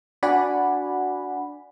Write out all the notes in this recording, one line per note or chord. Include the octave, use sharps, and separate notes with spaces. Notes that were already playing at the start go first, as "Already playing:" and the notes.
D4 F#4 D5 F#5 G#5 B5